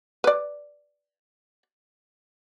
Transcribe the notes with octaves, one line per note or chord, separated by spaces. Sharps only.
B4 D5